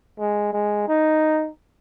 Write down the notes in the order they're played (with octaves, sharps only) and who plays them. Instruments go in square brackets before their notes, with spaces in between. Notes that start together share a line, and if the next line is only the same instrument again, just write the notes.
[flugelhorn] G#3
G#3
D#4